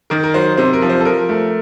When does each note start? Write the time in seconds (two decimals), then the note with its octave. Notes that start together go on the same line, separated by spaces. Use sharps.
0.10 D#3 A#4
0.24 A#4
0.34 F#3 C5
0.57 C3 C5
0.73 A#4
0.82 F3
0.89 C5
1.01 A4
1.05 F3 A#4
1.29 A3